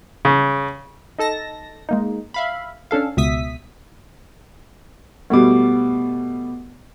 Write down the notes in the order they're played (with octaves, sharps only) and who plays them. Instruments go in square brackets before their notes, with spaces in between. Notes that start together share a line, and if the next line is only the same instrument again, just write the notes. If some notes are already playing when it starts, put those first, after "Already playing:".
[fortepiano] C#3
[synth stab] D#4 A4 A5 A#6
G#3 A#3 D#4
E5 F5 B5
C#4 D4 A4 F5
C#2 B2 E5 D#6 B6
[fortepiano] B2 G3 A3 [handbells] B3 D6